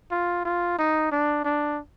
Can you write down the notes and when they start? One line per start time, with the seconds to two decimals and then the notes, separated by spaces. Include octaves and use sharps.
0.11 F4
0.45 F4
0.78 D#4
1.12 D4
1.44 D4